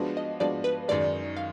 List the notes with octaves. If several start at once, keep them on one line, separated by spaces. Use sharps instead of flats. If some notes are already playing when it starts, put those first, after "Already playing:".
Already playing: F3 G#3 B3 D4 F#4
D#5
F3 G#3 B3 D4 F#4 D5
B4
F#2 D#3 G#3 D5
F5